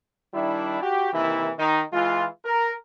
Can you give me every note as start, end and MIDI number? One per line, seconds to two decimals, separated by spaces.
0.34 0.81 51
0.34 0.81 55
0.34 0.81 62
0.34 0.81 64
0.82 1.12 66
0.82 1.12 67
1.13 1.51 48
1.13 1.51 51
1.13 1.51 52
1.13 1.51 58
1.13 1.51 64
1.59 1.82 51
1.59 1.82 63
1.93 2.25 52
1.93 2.25 56
1.93 2.25 65
2.45 2.72 70